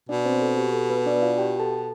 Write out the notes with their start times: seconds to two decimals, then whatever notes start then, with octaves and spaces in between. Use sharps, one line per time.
0.09 B2 D4 D5
0.25 C4 C5
0.42 A4
0.58 G4
0.73 A4
0.90 B3 B4
1.06 D4 D5
1.22 F4 F5
1.38 G4 G5
1.60 A4 A5